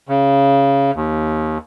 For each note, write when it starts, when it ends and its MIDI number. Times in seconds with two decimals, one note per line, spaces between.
0.09 0.91 49
0.95 1.58 39